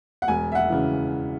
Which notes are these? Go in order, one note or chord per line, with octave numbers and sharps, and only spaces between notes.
F#5
E1 G#5
E5
F#5
C#3 E3